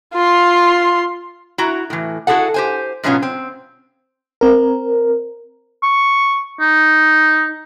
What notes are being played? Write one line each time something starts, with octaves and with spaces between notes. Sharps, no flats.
F4 C6
E4 F#4 A#5
A2 E3
E4 F#4 G#4 A4 F#5
G4 C5 G#5
G#2 B2 F#3 B3 C#4 F4
C4
C4 A#4
C#6
D#4